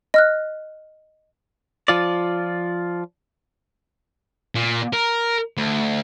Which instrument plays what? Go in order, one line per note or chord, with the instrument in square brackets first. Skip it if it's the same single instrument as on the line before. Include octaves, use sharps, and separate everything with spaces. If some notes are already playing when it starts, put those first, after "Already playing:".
[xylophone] D#5 F6 F#6
[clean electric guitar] F3 F4 D5
[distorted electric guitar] A#2
A#4
D2